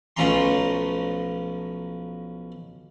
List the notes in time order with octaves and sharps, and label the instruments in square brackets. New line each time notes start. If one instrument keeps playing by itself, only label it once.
[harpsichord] B1 F3 A3 C#4 A#5 C6